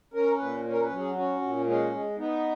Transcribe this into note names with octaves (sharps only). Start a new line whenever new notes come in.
C#4 A#4
A#2 B4
C#4
A#4
B4
F#3
G#4
C#4 F#4
A#2
G#3 C#4
G#3
B3 D#4